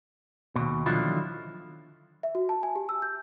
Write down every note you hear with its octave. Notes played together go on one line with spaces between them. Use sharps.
D#2 B2
D3 D#3 F3 F#3 E4 F4
E5
F#4
A5
G#5
G4
E6
G6